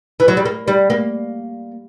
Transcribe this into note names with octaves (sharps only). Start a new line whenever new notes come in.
E3
F#3
G3
A#3
G3
A#3